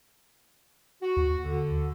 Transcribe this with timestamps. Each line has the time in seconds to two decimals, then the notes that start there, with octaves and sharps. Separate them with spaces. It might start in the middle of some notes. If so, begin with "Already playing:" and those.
1.02 F#4
1.17 D#2
1.45 D3